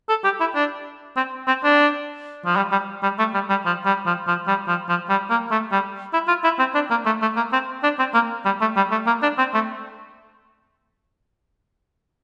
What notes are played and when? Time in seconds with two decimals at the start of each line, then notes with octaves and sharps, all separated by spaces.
0.09 A4
0.24 G4
0.40 E4
0.55 D4
1.17 C4
1.47 C4
1.64 D4
2.45 F3
2.56 G3
2.72 G3
3.03 G3
3.19 A3
3.34 G3
3.49 G3
3.65 F3
3.85 G3
4.06 F3
4.27 F3
4.47 G3
4.68 F3
4.89 F3
5.09 G3
5.30 A#3
5.51 A3
5.72 G3
6.13 E4
6.28 F4
6.44 E4
6.59 C4
6.74 D4
6.90 A#3
7.06 A3
7.22 A3
7.36 A#3
7.52 C4
7.83 D4
7.99 C4
8.14 A#3
8.45 G3
8.61 A3
8.76 G3
8.91 A3
9.07 A#3
9.22 D4
9.38 C4
9.54 A3